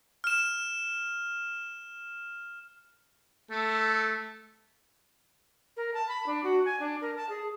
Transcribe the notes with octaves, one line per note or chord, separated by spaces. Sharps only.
F6 E7
A3 A4
A#4
A5
B5
D4
F#4
G#5
D4
A#4
A5
G#4